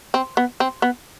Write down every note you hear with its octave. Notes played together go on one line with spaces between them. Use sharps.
C4
B3
C4
B3